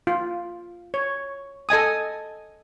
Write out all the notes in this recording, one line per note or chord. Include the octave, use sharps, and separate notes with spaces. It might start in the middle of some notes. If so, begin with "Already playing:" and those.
F4
C#5
A4 D#5 G#5 D#6